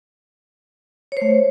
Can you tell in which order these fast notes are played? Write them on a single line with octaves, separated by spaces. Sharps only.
C#5 C5 A3